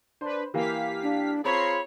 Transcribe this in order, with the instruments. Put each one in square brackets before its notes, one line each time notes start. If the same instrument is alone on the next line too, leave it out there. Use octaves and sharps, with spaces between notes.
[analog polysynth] D4 B4 [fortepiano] C5
[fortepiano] E3 A#3 [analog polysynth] G4 F5 B6
[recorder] D4
[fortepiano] C4 [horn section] F4 G#4 C#5 [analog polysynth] A#5 C7 [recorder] B5